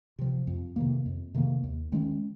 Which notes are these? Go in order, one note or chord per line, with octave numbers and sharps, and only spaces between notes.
C3 F3
F2
C3 D#3 A#3
F2
C3 D#3 A#3
D#2
D#3 G#3 C#4